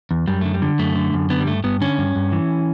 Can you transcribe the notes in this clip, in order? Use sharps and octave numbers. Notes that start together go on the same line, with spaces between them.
E2
F#2 G3
D3 A3
G3
D3
F#2 A3
D3
F#2
D3 B3
G3
G2 A3
G2 B3
D3 C#4
G2
G2
E3